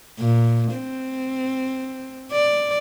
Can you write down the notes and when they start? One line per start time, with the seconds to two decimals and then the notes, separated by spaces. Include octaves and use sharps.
0.19 A#2
0.74 C4
2.32 D5